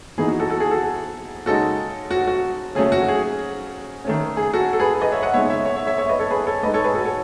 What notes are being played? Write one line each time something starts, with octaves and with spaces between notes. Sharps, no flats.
E3 B3 D#4 G#4
F#4
F#4 A4
F#4 A4
G#4
F#4 A4
C#3 G#3 D#4 F#4 A4
F#4
F#4
C#3 F#3 A3 C#4 G#4
F#4
G#4
D#3 A3 C#4
G#4
F#4 A4
A4
G#4 B4
B4 D#5
C#5 E5
D#5 F#5
C#3 G#3 B3 D#4 C#5 E5
C#5 E5
C#5 E5
C#5 E5
C#5 E5
C#5 E5
B4 D#5
A4 C#5
G#4 B4
A4 C#5
A2 G#3 D#4 B4 D#5
A4 C#5
G#4 B4
F#4 A4
A4 C#5